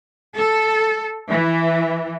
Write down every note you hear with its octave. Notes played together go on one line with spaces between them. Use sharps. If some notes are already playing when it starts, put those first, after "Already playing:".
A4
E3